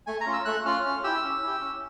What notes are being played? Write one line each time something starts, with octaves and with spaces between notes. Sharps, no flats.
A3 G#5
A#5
C#4 F4
E6
A3 F#6
C#4 F4 F6
C#4 F6
E4 G4 E6
C#4
E4 G4
C#4